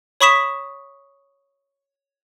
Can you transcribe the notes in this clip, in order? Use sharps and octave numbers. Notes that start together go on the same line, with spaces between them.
C#5 B5 C#6 D#6 B6 E7